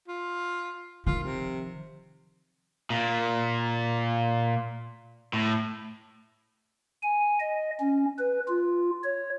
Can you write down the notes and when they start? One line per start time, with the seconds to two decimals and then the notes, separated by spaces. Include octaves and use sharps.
0.08 F4
1.06 D#3 F3 F4
1.23 C3
2.90 A#2
5.33 A2
7.03 G#5
7.40 D#5
7.80 C#4
8.19 B4
8.48 F4
9.04 C#5